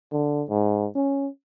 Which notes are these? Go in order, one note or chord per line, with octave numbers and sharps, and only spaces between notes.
D3
G#2
C#4